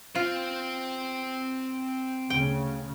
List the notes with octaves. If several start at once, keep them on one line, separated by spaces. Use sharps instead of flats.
C4 F4 C5
D2 C#3 G5